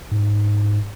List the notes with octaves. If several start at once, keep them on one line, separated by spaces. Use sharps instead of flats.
G#2